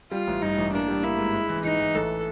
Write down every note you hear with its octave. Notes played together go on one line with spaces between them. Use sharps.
G3 F4
A1
G2 D#4
A1
A#3 D4
G3
A#3 E4
G#2
G#3
E3
E3 D#4
E3
A1 A4